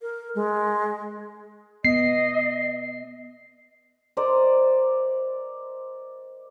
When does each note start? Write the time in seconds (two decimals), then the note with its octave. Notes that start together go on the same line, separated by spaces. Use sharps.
0.02 A#4
0.35 G#3
1.85 B3 D#5 C7
4.17 A#4 C5 D5 D#5